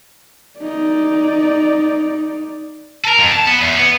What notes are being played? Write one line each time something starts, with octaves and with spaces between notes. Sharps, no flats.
D#4 D5
A4 A#4
F2
A5
B3
E2
B3